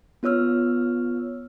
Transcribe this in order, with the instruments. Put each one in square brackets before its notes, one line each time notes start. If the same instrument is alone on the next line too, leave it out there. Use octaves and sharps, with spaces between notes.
[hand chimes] B3 F4 C#5 E6 F6